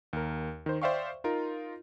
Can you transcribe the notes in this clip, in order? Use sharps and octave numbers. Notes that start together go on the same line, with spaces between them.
D#2 A#4
D#3 C5
C5 D5 E5 F5 G5 C#6
D#4 F4 A#4